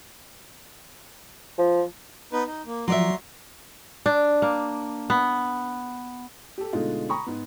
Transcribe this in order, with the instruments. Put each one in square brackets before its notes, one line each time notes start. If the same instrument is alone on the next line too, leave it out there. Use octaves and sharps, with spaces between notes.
[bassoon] F3
[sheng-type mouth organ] B3 D#4 B4
D#4
A#3
[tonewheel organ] F3 [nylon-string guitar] F#3 D5 E5 [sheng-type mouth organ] A#5 C6
[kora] D4
A#3
B3
[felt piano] G4 A4
B2 D3 G#3 A3 D#4 F4
A#5 B5 C#6 D#6
G#2 B3